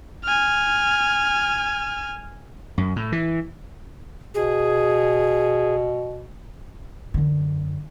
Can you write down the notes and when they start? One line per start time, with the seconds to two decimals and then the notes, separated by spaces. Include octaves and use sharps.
0.25 G#5 F6
2.78 F#2
2.96 A2
3.12 E3
4.35 B2 G#4
7.14 F#2 D3